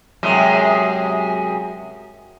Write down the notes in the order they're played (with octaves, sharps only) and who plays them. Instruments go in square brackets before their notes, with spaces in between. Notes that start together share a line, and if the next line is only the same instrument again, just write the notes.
[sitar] F#2 C3 G#3